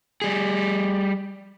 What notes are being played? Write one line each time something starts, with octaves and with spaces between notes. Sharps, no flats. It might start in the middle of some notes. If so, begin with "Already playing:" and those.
G3 G#4